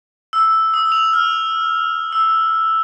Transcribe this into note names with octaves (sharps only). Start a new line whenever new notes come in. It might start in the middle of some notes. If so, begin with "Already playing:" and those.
E6
D#6
F7
F6
E6